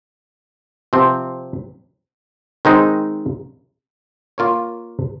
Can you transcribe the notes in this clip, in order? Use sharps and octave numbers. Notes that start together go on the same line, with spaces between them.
C3 F3 C4
D#3 G#3 C4 D#4
A#3 F4 A#4 C#5